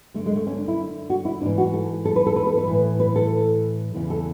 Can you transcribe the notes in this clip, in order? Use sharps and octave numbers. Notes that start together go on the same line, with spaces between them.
F#2 D3 A3
G#3
A3
C#4
D4
E4
F#4
E4
G#2 E3 D4
F#4
A4
A4
B4
A4
B4
A4
B4
A2 E3
B4
A4
E2 C#3 E3
A4